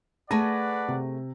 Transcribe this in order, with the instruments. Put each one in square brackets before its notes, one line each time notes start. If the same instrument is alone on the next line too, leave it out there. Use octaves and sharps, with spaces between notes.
[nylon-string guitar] A3 G#4 G#5 [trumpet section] B4 D5 F#5 [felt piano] A5 A#6
[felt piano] C3